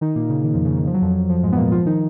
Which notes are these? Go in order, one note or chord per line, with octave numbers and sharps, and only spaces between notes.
D#3 D#4
A#2 A#3
C#3
D#3
F2 F3
C#3
D#3
F3
F#3
F2 F3
F2 F3
G#2 G#3
B3
A#2 A#3
F3 F4
D#3 D#4